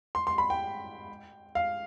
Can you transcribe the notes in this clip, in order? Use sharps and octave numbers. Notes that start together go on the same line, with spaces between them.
C6
C6
B5
G5
F5